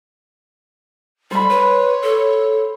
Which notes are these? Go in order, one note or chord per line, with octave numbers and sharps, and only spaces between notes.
G3 C5 B5
B4 C#5
A4